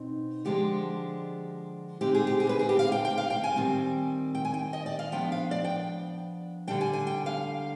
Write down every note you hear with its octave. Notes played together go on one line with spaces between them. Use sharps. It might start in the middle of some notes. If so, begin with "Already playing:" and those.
Already playing: B2 C4 D#4
D3 F3 G#3 D4 G4
D3 G#3 C4 D#4 G4
G#4
G4
G#4
B4
G#4
G4
F5
G5
G5
F5
G5
G#5
D#3 G3 C4
G5
G#5
G5
D#5
D5
F5
F3 B3 D4 G5
F5
D5
G5
D3 G3 D4 G5
G#5
G#5
G5
F5